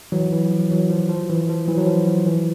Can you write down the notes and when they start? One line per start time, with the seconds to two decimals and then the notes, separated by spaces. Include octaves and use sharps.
0.12 E3 F#3
0.32 E3
0.51 F3
0.71 E3 F#3
0.90 F3
1.09 F3
1.29 E3
1.49 F3
1.68 E3 F#3
1.78 F#3
1.87 F3
2.07 F3
2.26 E3